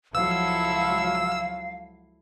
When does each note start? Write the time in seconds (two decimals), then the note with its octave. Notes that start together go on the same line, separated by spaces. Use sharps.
0.15 C#2 F3 F#3 E4 A4 F5 E6